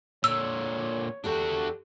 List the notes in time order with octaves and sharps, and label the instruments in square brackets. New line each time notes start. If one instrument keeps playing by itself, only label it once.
[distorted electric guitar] A#2 D3 [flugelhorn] C#5 [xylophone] E6
[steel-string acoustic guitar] E2 G4 A4 [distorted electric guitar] D4 F#4